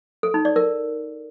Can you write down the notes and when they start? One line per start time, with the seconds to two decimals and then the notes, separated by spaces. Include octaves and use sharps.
0.23 A4
0.34 D#4
0.45 D5
0.56 A#4